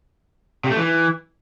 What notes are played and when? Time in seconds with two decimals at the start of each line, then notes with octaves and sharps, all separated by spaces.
0.64 C3
0.70 A3
0.77 E3